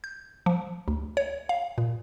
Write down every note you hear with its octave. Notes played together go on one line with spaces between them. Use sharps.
G6
F3
D2
C#5
F5
A#2